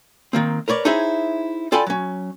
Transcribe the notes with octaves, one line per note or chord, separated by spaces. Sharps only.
D#3 A#3 C4
A#4 B4 C#5 D5
D#4 E4 G#4 C5 C#5 E5
F4 A4 D5 G5 G#5 B5
F#3 C#4